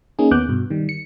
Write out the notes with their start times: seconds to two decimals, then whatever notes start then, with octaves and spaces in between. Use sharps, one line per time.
0.19 A#3 C#4 D#4 G#4
0.31 D#2 B3 D6 F#6 G6
0.48 G2 B2
0.70 D#3 G3
0.89 C#7